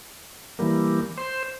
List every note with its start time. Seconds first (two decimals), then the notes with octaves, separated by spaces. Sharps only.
0.59 E3 G3 A#3
1.18 C5